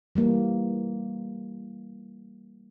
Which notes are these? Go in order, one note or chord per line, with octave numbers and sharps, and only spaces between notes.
E3 G3 A#3